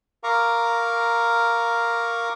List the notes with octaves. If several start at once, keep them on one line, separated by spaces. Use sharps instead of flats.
A#4 F5 A#5 C#6 D6